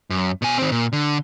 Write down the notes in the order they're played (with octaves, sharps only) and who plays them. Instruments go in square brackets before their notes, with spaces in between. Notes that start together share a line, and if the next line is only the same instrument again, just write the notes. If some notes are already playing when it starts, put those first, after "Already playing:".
[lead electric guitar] F#2
B2 G#5
D#3 C4
A#2
D3